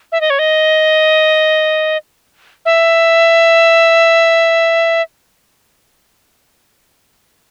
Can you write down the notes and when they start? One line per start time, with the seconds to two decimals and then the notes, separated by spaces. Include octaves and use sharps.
0.12 E5
0.21 D#5
0.30 C#5
0.39 D#5
2.65 E5